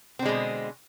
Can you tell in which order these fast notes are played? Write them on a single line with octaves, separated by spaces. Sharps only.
C4 D3 G#3 B2